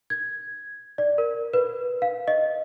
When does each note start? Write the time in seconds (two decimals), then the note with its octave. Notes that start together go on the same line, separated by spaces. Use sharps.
0.10 G#6
0.98 D5
1.18 A#4
1.53 B4
2.02 F5
2.28 D#5